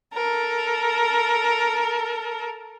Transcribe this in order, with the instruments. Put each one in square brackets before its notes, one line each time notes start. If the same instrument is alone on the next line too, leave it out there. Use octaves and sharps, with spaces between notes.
[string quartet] A4 A#4